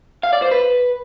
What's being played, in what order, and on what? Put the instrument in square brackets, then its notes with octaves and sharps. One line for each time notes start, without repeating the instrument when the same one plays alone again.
[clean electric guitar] F5
D5
C5
B4